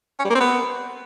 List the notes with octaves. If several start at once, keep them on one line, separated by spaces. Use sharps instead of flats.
C#4
G3
A#3
C4
B3